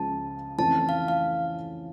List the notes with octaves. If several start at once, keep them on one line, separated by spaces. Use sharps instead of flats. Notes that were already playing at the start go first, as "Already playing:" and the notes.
Already playing: C#2 C#3 F3 A5
F2 E3 A3 C#4 A5
F5
F5